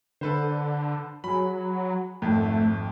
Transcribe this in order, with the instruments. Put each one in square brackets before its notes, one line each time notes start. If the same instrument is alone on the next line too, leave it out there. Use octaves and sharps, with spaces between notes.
[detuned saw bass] D3 [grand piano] A4 B4 C5
[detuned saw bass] F#3 [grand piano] G#4 B5
[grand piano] G#1 F2 [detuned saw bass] A3